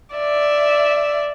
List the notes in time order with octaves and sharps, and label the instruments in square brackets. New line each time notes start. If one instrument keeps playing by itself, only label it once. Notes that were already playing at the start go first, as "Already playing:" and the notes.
[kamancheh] D5 E5